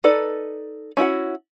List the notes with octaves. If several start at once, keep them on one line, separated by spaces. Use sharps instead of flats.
D#4 A4 B4 D5
C#4 E4 F#4 F#5